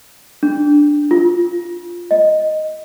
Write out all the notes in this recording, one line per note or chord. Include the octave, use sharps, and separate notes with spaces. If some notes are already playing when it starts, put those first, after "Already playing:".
D4
F4
D#5